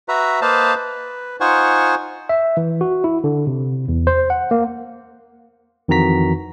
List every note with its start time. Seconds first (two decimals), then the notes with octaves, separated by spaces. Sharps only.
0.08 F#4 B4 E5 A#5
0.42 A#3 B4 C5 D#5 F5 A5
0.75 B4
1.40 D#4 F4 C5 F#5 G#5 C#6
2.29 E5
2.57 E3
2.81 F#4
3.04 E4
3.24 D3
3.47 C3
3.88 E2
4.07 C5
4.30 F#5
4.51 A#3
5.88 F2 D#3 E3 F#4 A#5 B6